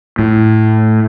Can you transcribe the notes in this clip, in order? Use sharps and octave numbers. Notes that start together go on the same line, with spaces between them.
A2